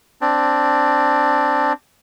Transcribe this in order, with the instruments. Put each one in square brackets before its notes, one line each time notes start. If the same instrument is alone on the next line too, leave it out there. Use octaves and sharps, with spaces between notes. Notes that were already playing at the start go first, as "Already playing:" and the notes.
[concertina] C4 D4